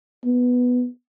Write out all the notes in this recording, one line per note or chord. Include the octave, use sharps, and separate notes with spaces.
B3